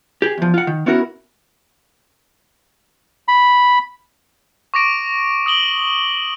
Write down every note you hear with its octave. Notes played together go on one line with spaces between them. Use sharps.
G4 G#4
E2 F3
F4 F#5
D#3
B3 C#4 E4 F#4 A4 A#4
B5
C#6 D6 A#6 D7
D#6 D7 F#7 G7